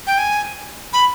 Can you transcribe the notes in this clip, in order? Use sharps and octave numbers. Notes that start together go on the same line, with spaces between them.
G5
G#5
B5